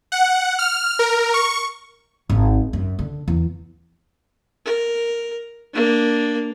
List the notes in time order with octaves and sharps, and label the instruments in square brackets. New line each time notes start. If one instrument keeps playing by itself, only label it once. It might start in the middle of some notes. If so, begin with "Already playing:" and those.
[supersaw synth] F#5
F6
A#4
C#6
[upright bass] G#1
F#2
D3
E2
[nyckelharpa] A#4
A#3 D4